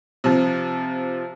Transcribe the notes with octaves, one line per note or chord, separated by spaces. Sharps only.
C3 F3